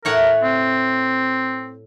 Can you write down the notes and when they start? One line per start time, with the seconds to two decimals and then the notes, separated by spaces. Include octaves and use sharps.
0.05 A2 A#4 C#5 F#5
0.43 C4